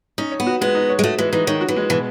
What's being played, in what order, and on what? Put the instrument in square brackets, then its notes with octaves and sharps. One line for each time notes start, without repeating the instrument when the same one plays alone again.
[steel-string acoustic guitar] C#4 [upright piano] D#4
[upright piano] C#5
[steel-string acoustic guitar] B3
[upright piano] F#4
[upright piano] G#3 [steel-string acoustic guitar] B3
[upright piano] D#4
C#5
[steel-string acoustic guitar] G#3
[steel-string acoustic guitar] A3 [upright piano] F#4
[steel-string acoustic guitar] E3 [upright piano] G#3
[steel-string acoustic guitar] E3 [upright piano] D#4
[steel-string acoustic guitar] D#3 [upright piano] C#5
[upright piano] F#4
[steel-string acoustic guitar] E3
[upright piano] G#3
[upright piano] B2 [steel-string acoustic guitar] E3